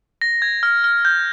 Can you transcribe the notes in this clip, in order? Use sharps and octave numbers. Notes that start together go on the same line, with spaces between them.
A#6
G#6
F6
F6
G6